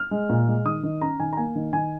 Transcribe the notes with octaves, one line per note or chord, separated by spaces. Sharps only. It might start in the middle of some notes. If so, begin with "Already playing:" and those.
Already playing: F6
G#3
A#2
G#3
D#3 D#6
D#3
C#4 A#5
D#3 G#5
A#5
A#3 G#5
D#3
D#3 G#5